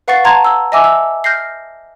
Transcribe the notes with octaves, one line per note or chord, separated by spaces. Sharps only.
B4 F5 F#5 C#6 A6 C7
F#5 A5 A#5 C6 G#6
E6
D#5 E5 G#5 D6 E6
E6
F6 G6 A#6 C7